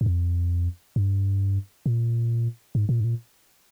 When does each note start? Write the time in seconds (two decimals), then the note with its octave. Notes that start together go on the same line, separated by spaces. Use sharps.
0.01 G2
0.06 F2
0.96 G2
1.86 A#2
2.75 G#2
2.89 A#2
3.00 G#2
3.04 A#2